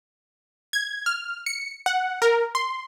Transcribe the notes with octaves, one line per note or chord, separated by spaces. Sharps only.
G#6
F6
C#7
F#5
A#4
C6